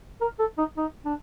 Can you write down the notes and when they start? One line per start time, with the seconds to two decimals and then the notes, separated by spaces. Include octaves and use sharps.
0.21 A#4
0.39 A4
0.58 D#4
0.77 D#4
1.05 D4